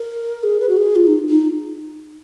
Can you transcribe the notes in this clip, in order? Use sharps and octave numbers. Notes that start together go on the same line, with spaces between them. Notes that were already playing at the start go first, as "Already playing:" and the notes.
Already playing: A#4
G#4
B4
F#4
G#4
F4
D#4
D#4